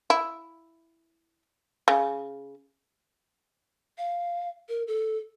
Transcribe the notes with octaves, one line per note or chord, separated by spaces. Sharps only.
E4
C#3
F5
A#4
A4